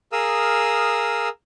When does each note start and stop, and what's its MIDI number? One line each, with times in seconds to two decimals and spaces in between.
0.12 1.29 68
0.12 1.29 70
0.12 1.29 77
0.12 1.29 87
0.12 1.29 88